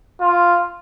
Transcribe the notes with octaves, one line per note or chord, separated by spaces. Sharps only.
F4